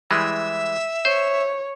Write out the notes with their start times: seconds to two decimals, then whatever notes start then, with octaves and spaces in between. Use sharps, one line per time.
0.11 E3 G3 G#3 E5
1.05 C5 C#5